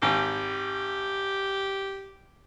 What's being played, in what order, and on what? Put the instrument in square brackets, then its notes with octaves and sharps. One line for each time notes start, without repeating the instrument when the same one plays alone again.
[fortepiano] G#1 [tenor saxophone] G4